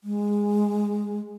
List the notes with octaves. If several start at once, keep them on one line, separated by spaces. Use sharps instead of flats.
G#3